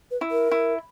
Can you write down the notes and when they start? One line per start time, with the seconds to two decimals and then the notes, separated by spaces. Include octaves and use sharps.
0.11 B4
0.21 E4
0.31 A#4
0.52 E4